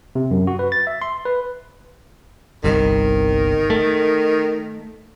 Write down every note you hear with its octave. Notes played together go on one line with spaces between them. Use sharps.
C3
F#2
F#4
B4
A6
E5
C6
B4
G1 C2 D#3
A3